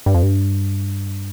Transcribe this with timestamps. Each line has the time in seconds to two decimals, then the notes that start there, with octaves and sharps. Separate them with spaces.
0.06 G2
0.15 F2
0.23 G2